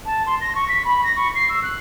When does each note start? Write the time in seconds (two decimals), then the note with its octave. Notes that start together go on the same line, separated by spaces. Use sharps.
0.05 A5
0.26 C6
0.41 A#6
0.55 C#6
0.68 B6
0.84 B5
1.04 A#6
1.16 C#6
1.35 C7
1.48 E6
1.62 F#6